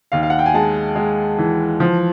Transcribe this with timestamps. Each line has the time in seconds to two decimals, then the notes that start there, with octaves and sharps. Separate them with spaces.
0.12 D#2 F5
0.23 F5
0.30 F#5
0.39 G5
0.46 G#5
0.54 G#3 A5
0.96 G#3
1.38 E3
1.80 F3